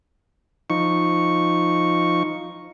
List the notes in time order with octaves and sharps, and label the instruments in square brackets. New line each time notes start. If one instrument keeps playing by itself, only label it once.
[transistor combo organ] F3 D#4 C#6